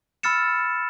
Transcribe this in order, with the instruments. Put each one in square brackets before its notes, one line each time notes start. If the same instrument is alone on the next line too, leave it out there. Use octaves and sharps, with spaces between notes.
[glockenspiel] B5 E6 F6 A6 C#7 E7